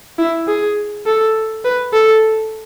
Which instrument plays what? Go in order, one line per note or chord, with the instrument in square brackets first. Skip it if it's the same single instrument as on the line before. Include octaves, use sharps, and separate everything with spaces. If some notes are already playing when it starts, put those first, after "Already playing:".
[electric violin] E4
G#4
A4
B4
A4